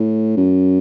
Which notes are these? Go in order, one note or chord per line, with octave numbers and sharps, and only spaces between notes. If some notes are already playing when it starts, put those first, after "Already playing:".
Already playing: A2
F#2